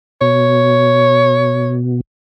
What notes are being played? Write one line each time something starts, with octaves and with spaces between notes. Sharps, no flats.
B2 C#5